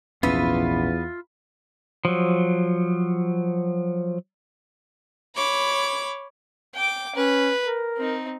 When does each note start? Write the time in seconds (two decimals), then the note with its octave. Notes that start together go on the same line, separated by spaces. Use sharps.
0.23 A#1 E2 G#2 B3 C#4 F4 E5
2.05 F3 F#3
5.36 C#5 B5 D6
6.75 G5 D6
7.16 C#4 B4
7.65 A#4
7.97 C4 D#4